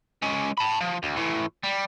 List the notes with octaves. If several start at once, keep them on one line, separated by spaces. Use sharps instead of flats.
G#3 C#4
A5 B5
F3
D2
A2 E3
G3